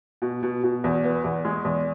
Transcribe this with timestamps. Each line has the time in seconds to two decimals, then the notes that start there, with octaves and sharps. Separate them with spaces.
0.22 B2
0.43 B2
0.63 B2
0.84 E2
1.04 B3
1.24 E2
1.45 G#3
1.65 E2